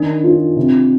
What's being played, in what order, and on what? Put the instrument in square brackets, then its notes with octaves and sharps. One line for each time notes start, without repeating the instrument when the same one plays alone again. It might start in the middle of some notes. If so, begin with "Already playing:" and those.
Already playing: [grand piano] D#3 [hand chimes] D4
[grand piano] F4
C3